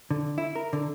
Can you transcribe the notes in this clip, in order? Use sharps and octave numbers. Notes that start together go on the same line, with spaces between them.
D3
E4
A#4
D3